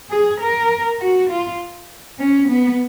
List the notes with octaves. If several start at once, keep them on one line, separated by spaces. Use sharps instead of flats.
G#4
A#4
F#4
F4
C#4
B3